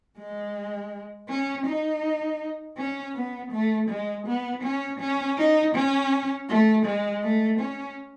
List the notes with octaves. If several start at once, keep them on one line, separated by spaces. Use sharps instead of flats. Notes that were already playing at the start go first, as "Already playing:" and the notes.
G#3
C#4
D#4
C#4
B3
A3
G#3
B3
C#4
C#4
D#4
C#4
A3
G#3
A3
C#4